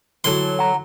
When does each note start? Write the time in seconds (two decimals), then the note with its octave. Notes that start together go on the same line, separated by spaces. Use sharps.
0.24 D3 E3 F#3 F#4 A4 C6
0.59 F#5 A#5